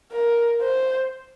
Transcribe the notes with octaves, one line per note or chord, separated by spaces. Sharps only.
A#4
C5